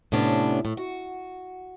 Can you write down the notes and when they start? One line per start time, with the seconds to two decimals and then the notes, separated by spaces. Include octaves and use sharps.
0.12 A2 C3 B3 C#4 D4
0.65 A2
0.77 F#4